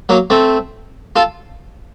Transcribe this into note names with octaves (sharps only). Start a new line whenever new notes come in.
F#3 A#3
A3 C4
F4 A4